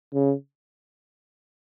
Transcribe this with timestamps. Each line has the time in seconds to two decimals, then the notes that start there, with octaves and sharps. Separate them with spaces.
0.14 C#3